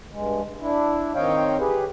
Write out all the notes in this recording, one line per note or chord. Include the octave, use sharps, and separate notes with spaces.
G2 G#3
D4 E4
D#3 C4 C#5 D#5 F5 G5
G4 G#4 B4